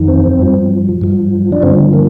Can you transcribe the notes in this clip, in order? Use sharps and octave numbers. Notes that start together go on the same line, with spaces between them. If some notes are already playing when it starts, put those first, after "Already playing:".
Already playing: F2 D#3
C4
G2 F3
G2 F3
D4
G2 D3 F3 C4
A#3